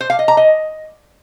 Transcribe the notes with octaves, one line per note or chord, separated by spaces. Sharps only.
C5
F5
D#5
A#5
D#5